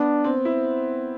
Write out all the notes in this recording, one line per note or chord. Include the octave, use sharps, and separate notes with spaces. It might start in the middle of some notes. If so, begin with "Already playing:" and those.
Already playing: B3 D4
C4
E4